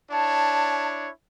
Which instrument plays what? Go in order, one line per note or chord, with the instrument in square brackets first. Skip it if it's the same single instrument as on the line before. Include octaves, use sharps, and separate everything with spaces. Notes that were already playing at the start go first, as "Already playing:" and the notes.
[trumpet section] D4 E4 C#5 [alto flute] A5